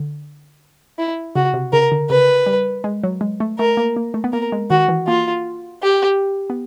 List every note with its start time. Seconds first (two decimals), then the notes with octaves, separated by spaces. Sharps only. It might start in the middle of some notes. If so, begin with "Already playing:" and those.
Already playing: D3
0.99 E4
1.35 C#3 F#4
1.54 C3
1.72 C#3 A#4
1.92 D3
2.10 C#3 B4
2.46 G3
2.84 G#3
3.04 F#3
3.21 G#3
3.40 A3
3.59 A3 A#4
3.77 A#3
3.96 A#3
4.14 A3
4.24 B3
4.33 A#3 A#4
4.52 G#3
4.70 D#3 F#4
4.89 E3
5.07 A#3 F4
5.82 G4
6.50 B3